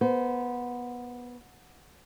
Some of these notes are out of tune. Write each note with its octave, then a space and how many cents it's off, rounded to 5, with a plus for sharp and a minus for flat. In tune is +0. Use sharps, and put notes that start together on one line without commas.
B3 -15 C5 -30